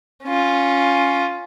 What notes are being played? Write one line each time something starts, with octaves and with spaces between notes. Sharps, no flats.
C#4 F4